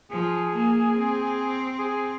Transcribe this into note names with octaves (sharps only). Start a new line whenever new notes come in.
F3 G#4
A#3
C4
G#4